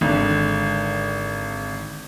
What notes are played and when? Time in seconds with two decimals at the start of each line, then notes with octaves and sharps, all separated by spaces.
0.01 G#1 D3